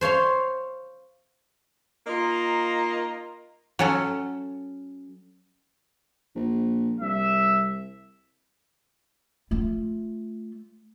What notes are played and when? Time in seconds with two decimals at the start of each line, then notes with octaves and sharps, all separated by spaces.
0.01 C5 C#5 F5 C6
2.07 A#3 D#4 F4
3.79 F#3 C#4 A4
6.36 A#1
7.00 C2 E5
9.51 A3 F4